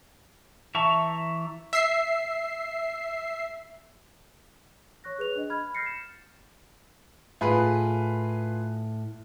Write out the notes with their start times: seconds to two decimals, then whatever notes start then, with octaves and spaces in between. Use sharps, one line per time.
0.75 E3 E5 A5 A#5 C#6
1.73 E5 C7
5.04 C#5 C#6 F#6 A#6
5.18 G#4 B4 F#6 F7
5.36 D4 D#5
5.50 B5 F6 G#6
5.75 F6 G6 A6 A#6 C7 C#7
5.86 E7
7.41 A2 F4 G#4 B4